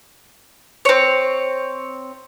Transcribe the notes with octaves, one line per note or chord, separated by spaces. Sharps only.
C4 C#5